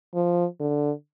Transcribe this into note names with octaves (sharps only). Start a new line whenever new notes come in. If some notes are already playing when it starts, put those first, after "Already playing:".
F3
D3